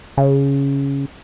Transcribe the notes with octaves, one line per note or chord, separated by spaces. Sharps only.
C#3